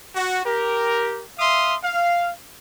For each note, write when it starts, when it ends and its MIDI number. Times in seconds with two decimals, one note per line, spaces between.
0.16 0.43 66
0.46 1.24 67
0.46 1.24 70
1.39 1.75 76
1.39 1.75 77
1.39 1.75 84
1.39 1.75 87
1.84 2.30 77